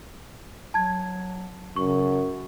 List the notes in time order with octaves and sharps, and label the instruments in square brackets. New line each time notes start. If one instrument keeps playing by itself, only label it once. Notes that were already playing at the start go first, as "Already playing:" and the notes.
[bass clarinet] F#3 [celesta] A5 G#6
[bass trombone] F#2 [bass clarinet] C#3 [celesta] C#6